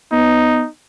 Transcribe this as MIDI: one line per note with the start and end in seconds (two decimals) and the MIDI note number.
0.12 0.63 59
0.12 0.69 63